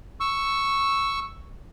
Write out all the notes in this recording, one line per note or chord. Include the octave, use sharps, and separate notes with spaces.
C#6 E6